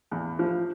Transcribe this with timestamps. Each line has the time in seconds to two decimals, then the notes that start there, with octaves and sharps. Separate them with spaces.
0.11 E2
0.39 F3